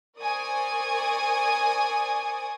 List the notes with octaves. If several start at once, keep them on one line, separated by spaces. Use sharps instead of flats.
A#4 C5 D5 G#5 C#6 D#6